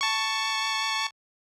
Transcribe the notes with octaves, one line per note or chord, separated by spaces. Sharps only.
A5 C#6